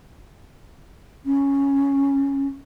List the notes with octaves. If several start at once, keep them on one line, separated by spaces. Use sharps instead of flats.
C#4